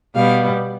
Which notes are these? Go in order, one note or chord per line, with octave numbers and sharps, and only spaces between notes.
B2 G3 B3 F5